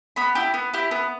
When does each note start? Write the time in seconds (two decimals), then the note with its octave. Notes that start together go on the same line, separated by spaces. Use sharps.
0.16 B3 B5
0.35 E4 G4
0.54 B3
0.73 E4 G4
0.91 B3